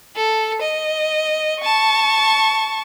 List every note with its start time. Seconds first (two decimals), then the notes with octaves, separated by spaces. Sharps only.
0.16 A4
0.62 D#5
1.61 A5 C#6